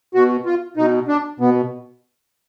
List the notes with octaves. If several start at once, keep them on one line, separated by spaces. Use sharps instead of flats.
B2 F#4
F4
B2 D#4
D4
B2 B3